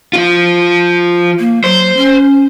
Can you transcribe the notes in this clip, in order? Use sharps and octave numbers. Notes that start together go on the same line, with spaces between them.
F3 F4
A#3
F#3 C5
C#4